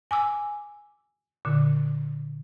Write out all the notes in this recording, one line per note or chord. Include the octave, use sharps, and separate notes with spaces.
G#5 D6 E6
A#2 D3